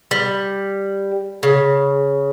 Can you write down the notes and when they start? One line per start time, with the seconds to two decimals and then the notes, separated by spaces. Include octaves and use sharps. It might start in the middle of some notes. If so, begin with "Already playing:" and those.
0.11 G3
1.43 C#3